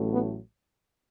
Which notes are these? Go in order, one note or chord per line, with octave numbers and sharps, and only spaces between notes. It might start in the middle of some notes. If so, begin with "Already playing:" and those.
Already playing: A1 A2 F#3 A3
B3